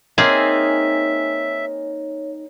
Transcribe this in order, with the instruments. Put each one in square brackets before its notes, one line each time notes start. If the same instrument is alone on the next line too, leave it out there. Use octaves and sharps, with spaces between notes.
[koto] A#3 C4 G#4 [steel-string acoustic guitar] D#4 G#5 [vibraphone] C#5 [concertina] E5